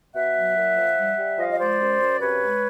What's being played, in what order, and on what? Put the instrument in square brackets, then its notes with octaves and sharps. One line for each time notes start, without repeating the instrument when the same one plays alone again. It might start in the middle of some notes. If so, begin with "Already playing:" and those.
[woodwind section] B2 E5 F#5
F#3
A#2
F3
G3
G3
F3 D#5 F5
D#5
G#3 C5 D5
F#2
F#2
C3 B4 C#5
G#3